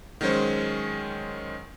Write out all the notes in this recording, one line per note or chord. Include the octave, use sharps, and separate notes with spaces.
D#3 F#3 G#3 C#4 C5